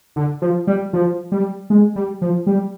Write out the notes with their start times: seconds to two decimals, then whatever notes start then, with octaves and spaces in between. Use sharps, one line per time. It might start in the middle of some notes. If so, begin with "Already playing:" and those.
0.16 D3
0.42 F3
0.67 G3
0.93 F3
1.32 G3
1.70 G#3
1.96 G3
2.22 F3
2.47 G3